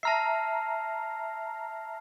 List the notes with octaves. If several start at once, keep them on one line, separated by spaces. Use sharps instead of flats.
E5 A5 A#5 F6 C7